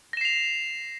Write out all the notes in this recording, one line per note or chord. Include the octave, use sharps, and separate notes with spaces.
A#6 C7 E7 F7